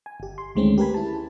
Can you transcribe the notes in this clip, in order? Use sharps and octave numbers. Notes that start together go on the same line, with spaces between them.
G#5
G1 G4
C6
D2 D#3 G#3 A3 C4 C#4
G4 A#4 B4 G#5 B5
E4 A5